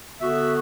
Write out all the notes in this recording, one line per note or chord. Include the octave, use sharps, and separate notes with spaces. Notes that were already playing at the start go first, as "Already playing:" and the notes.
D3 B3 F#4 E5